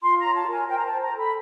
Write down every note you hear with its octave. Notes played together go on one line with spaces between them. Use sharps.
F4 C6
A#5
C#5
A5
A#4 G#5
C5 G5
A#5
A5
C5
A#5
A4
B5